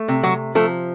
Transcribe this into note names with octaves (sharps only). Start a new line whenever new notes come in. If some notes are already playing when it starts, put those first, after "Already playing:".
Already playing: A3
C3
F#3 F#4
F3 A3 A4